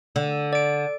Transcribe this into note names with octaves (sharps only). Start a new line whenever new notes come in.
D3
D5 D7